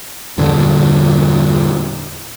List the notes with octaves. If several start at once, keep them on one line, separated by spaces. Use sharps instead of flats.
E2 G2 A#2 D3